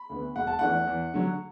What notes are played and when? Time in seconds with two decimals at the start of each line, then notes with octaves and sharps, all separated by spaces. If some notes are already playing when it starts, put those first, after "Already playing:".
Already playing: B5
0.10 D2 D3 B3
0.36 E1 F#5
0.47 A5
0.59 E2 E3 A3 D4 F#5
0.87 E2
1.14 D3 F#3